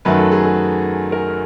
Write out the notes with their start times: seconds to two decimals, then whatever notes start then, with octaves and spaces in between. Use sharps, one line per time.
0.05 F#2 D#3 F#3 A3 B4
0.18 A4
0.32 G#4
0.45 G#4
1.12 A#4